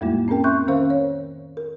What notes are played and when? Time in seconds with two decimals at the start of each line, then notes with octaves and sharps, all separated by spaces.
0.01 F2 A2 G3 G#3 A#3 E4
0.28 C4 C#4 G#4 A#4 G5
0.44 E5 C6 C#6 F#6 G6
0.68 D#3 C#4 A#4 C5 F5
0.90 C#5
1.57 A#4